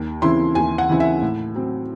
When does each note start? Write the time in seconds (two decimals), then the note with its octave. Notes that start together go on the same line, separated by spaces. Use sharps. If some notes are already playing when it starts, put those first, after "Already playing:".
Already playing: D#2
0.22 C#3 E3 C4 E4 C6
0.55 D#2 G#5
0.78 F#5
0.89 C#3 E3 C4 E4
1.00 E5
1.22 A2
1.55 F#3 C4